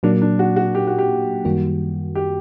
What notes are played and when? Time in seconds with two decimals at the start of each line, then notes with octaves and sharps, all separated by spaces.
0.03 A#2 F#3 A#3 D4
0.21 D4
0.39 F#4
0.56 F#4
0.75 G4
0.87 F#4
0.98 G4
1.45 F#2 D#3 G3 A#3 F#4
2.15 G4